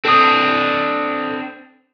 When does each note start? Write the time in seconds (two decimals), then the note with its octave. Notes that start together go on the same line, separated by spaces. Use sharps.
0.05 C4 D4 A4 D#6